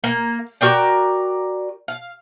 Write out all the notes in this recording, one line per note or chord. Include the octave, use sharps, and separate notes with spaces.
A#3
F#4 A#4 D5 G5
F5